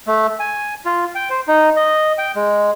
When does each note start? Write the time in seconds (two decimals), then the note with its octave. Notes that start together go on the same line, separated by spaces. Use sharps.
0.07 A3
0.40 G#5
0.85 F4
1.15 G5
1.30 C5
1.47 D#4
1.76 D#5
2.18 G5
2.36 G#3